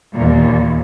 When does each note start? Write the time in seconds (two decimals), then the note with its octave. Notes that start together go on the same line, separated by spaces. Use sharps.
0.14 D#2 A#2